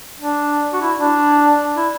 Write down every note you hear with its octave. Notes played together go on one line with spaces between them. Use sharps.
D4
F#4
E4
D4
E4